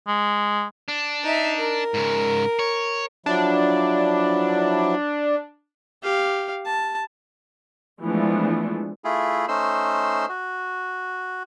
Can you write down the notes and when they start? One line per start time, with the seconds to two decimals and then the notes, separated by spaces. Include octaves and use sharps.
0.07 G#3
0.88 D4
1.24 D#4 E5
1.57 A#4
1.94 G#2 C#3
2.59 C#5
3.26 F3 F#3 D4 E4
6.03 G4 F5
6.66 A5
8.01 E3 F3 G#3 A3 B3 D4
9.04 A3 E4 F4 G#4
9.48 A3 C#4 D#4 C5 C6 E6
10.29 F#4